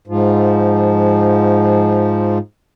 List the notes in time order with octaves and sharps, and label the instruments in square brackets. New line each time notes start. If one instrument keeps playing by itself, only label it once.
[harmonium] G#2 F3